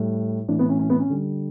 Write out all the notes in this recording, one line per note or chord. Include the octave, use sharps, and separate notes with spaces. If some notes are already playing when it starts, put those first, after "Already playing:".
Already playing: A2 G3
A2 E3 A3 D4
B3
C#4
C#4
B3
C#4
D3 G3